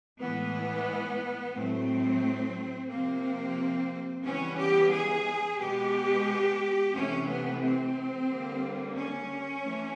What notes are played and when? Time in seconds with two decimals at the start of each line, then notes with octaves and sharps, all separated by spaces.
0.20 A2 E3 G#3 B3
1.54 A2 F#3 A3 C4
2.89 C3 F3 A#3 C4
4.24 C#3 E3 G3 B3 C#4
4.57 G4
4.91 G#4
5.59 B2 G#3 B3 G4
6.93 C3 E3 A3 C#4
7.27 B3
7.61 C4
8.28 D3 G3 A#3
8.95 C#4
9.62 E3 A3